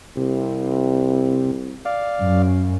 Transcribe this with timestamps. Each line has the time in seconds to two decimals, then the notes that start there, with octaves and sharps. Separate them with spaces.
0.17 C2 C3
1.85 D5 F5
2.21 F#2